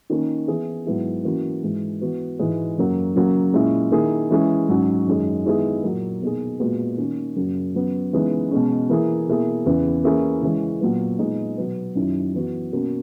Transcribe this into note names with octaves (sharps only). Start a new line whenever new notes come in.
D#3 A#3 C#4
E3 B3 E4 G#4
G#2 F#3 B3 E4 G#4
E3 A#3 C#4 F#4
G#2 E3 G#3
E3 B3 F#4
G#2 E3 G#3
F#2 C#3 F#3 A#3
C#3 F#3 A#3 C#4
A#2 G#3 C#4 E4
D#3 A#3 E4 G#4
E3 G#3 C#4 E4 G#4
G#2 F#3 C#4
F#2 D#3 G#3
D#3 G#3 B3 E4 G#4
A#2 F#3 A#3
B2 A#3 D#4 G#4
A#2 G#3 B3 F#4
D#3 A#3 C#4
F#2 C#3 F#3 A#3
C#3 F#3 B3
C#3 E3 G#3 B3 D#4
B2 G#3 C#4
E3 A#3 E4 G#4
B2 A#3 E4 G#4
E2 C#3 E3 B3
E3 A#3 C#4 E4 G#4
C#3 E3 G#3 C#4
A#2 F#3 B3
A#2 G#3 B3 D#4
B2 F#3 B3
F#2 D#3 F#3 C#4 E4
E3 B3 F#4
B2 A#3 C#4 F#4